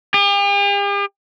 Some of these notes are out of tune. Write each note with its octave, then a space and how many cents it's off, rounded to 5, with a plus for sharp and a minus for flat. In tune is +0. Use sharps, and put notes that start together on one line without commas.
G4 +45